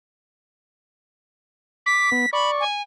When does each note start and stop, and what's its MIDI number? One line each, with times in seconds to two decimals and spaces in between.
1.86 2.10 86
1.86 2.30 95
2.12 2.26 59
2.33 2.64 74
2.33 2.51 83
2.33 2.64 85
2.60 2.82 80